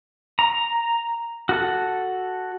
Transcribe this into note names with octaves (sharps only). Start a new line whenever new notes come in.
A#5
F#4 A4